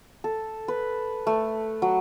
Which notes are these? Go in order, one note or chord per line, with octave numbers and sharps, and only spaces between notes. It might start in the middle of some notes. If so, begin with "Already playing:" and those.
A4
B4
A3
F#3